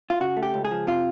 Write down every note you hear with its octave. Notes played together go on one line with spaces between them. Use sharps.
F4
C#3 F#4
A3
G4
C#2
G#4
F3
C3 F4